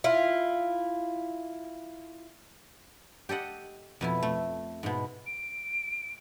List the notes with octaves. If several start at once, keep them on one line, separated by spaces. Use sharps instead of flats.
E4 F4
G4 A4 D#5 F#5
F2 B2 E4
A3
G#2 B2
D7